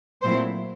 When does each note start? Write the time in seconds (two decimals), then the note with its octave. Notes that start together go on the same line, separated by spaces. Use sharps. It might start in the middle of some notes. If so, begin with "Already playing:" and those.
0.22 A#2 F#3 A3 C4 E4 C5